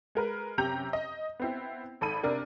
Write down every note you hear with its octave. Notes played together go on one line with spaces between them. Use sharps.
G#3 A#4 B4
F#2 C3 G4 A#5 G6 F7
D#5
B3 C4 E4
G#1 A4 B5 D#7
C3 D4 A#4